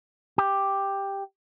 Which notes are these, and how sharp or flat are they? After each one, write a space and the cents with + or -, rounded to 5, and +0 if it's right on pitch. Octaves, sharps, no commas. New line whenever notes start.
G4 +5